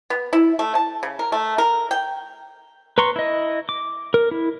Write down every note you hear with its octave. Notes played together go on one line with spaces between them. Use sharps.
B3
E4
A3
A5
C#3
A#4
A3
A#4
G5
B4 A#5 C6 C#6
E4 D#5
D6
A#4
E4